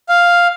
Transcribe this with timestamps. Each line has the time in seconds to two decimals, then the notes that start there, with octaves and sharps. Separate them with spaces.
0.09 F5